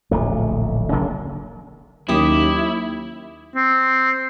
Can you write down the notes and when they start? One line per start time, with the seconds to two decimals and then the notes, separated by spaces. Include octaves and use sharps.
0.11 D1 A#1 A3
0.92 E1 C#3 F#3 A#3
2.09 D#2 F#3 A#3 C#4 E4 G4 D6 D#6
3.55 C4